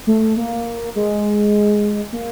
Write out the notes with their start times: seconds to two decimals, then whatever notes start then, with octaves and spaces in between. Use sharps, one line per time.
0.07 A3
0.37 A#3
0.95 G#3
2.13 A#3